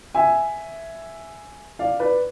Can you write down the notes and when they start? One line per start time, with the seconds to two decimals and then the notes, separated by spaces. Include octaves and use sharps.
0.15 E5 G#5
1.79 D5 F5
2.00 B4 D5